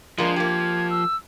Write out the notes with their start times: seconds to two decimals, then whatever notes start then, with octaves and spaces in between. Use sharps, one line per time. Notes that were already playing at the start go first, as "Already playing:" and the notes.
0.18 F3 G#3 A#3 D4 C6
0.36 A#3 G4 G#6
0.90 E6